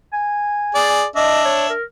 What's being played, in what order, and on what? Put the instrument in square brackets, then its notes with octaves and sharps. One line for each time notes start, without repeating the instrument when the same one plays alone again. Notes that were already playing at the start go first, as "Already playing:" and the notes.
[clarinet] G#5
[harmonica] G#4 D5
[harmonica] D4 E5 [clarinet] D#5
[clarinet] C#5
A#4